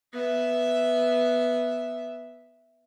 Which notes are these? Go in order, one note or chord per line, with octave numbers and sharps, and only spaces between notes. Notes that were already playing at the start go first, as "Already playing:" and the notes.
B3 E5